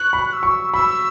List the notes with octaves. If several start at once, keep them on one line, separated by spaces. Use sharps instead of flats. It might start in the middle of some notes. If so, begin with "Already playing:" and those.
Already playing: C#6 F#6
B5
F#6
E6
C#6
B5 E6